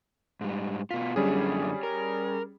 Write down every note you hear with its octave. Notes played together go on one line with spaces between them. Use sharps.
G#2 G3
B2 F4 B6
F#2 D3 G3 C#4 G#4
A#4